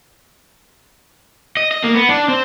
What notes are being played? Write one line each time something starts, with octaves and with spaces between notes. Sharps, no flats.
D#5
D#5
A#3
B3
D4
C4